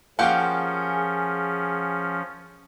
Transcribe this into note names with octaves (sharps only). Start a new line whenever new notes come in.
F3 A#3 C#4 F4 G4 G#4 F#5 G5